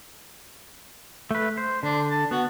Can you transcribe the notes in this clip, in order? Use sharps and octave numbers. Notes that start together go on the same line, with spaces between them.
A3 B4
C5
D3 D4
A5
B3 F#4